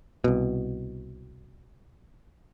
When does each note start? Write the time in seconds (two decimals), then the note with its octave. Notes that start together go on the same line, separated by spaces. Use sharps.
0.24 C2 B2